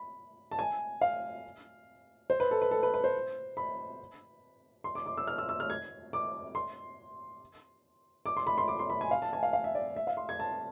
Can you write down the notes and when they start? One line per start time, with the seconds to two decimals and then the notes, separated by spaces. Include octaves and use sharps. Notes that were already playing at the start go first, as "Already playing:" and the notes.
Already playing: B5
0.51 A5
0.59 G#5
1.01 F5
2.30 C5
2.40 B4
2.51 A4
2.62 B4
2.71 A4
2.83 B4
2.94 B4
3.04 C5
3.57 B5
4.84 C6
4.95 D6
5.06 D6
5.18 E6
5.27 F6
5.38 E6
5.49 E6
5.60 F6
5.70 G#6
6.13 D6
6.55 C6
8.26 D6
8.37 C6
8.47 B5
8.58 C6
8.68 D6
8.79 C6
8.90 B5
9.01 G#5
9.11 F5
9.22 A5
9.33 G#5
9.43 F5
9.53 F5
9.64 E5
9.75 D5
9.96 E5
10.07 F5
10.17 C6
10.29 G#6
10.40 A5